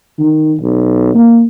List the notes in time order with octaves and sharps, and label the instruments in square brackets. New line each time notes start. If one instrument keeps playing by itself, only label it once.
[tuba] D#3
B1
A#3